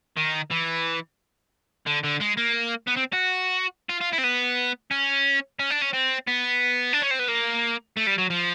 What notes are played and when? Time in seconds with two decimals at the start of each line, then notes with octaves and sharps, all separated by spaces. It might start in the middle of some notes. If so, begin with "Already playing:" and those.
0.17 D#3
0.51 E3
1.86 D3
2.04 D3
2.20 G#3
2.37 A#3
2.88 B3
2.97 C4
3.13 F#4
3.89 F4
4.01 F4
4.12 E4
4.18 C4
4.24 B3
4.91 C#4
5.59 C#4
5.70 D4
5.81 C#4
5.93 C4
6.27 B3
6.93 D4
7.02 C#4
7.11 C4
7.19 B3
7.28 A#3
7.97 A3
8.07 G3
8.18 F#3
8.30 F3